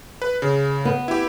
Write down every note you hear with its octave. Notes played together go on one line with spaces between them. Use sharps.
B4
C#3
B3
E4 G4